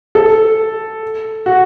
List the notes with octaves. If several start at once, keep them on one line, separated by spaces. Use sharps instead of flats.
A4
F#4